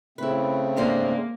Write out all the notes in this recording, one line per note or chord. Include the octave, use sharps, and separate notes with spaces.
C#3 A3 C4 E4 B4
G#2 D3 A#3 C5